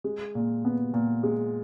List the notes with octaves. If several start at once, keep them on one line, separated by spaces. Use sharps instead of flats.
G#3
A#2
B3
A#2
G#3